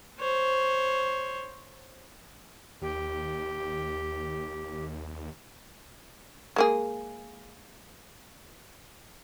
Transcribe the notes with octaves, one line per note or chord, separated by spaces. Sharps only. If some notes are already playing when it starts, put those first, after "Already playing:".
C5 C#5
D#2 G4
G#3 A#3 G#4